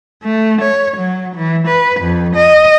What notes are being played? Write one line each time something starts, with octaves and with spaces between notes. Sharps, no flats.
A3
C#5
F#3
E3
B4
F2
D#5